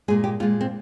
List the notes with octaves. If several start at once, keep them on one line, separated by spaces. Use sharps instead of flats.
A#2 G#3 G#4
G4
A#2 G#3 F4
C4